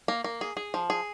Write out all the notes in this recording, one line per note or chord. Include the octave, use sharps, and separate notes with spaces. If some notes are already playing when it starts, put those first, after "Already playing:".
A#3
A#3
G#4
G#4
F3
G#4